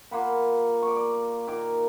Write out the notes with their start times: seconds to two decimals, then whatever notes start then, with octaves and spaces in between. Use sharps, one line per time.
0.11 A#3 F4 F#5 B5
0.82 D5 C#6
0.96 D5
1.47 A#2 D#3 D6